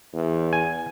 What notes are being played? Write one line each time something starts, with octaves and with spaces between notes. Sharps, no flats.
E2
G#5